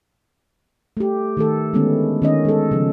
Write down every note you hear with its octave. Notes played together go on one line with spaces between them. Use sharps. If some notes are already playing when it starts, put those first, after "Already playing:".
A3 G4
D#3 A3 A4
D3 D#3 G#3 A3 B3 C#4
D#3 C#4 D#5
G#3 A4
C#3 F3